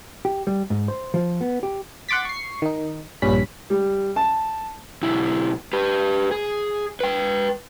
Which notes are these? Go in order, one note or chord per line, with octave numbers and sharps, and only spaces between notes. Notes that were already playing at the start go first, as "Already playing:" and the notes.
G4
G3
G#2
C5
F3
B3
G4
F#5 C6 D6 A6 B6
C#6 C7
D#3 D#4
A#1 G2 C#4 B5 B6
G3
A5
B1 E4
G4 B4
G#4
B4 G5